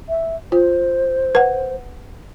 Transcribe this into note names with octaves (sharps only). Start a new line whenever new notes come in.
E5
F4 C5
B4 F#5